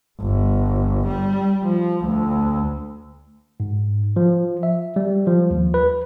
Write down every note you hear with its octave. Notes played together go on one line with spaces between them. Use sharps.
G1
G3
F3
D2
G#2
F3
E5
G3
F3
D#2
B4